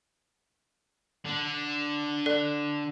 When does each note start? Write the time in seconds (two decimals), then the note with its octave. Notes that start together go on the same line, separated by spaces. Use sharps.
1.25 D3 D4
2.26 A4 D5